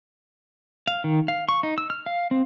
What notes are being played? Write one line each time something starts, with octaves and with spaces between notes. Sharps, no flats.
F5
D#3
F5
C#6
D#4
E6
F6
F5
C4